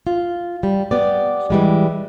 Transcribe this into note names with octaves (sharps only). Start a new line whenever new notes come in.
F4
G3
B3 G4 D5
E3 G3 G#3